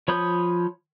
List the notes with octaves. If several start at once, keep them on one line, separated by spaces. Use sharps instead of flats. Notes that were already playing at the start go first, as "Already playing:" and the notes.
F3 C#5 B5 D#6 G6